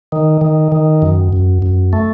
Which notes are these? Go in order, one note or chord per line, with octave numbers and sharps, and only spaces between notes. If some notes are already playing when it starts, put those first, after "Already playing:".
D#3
D#3
D#3
F#2
F#2
F#2
A3